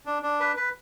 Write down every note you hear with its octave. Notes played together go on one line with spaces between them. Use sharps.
D4
D4
B4
B4